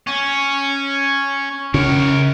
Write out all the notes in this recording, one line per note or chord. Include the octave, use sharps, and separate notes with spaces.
C#4
C#3 A#4 C#5